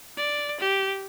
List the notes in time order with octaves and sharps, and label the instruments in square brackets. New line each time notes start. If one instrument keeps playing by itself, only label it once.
[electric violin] D5
G4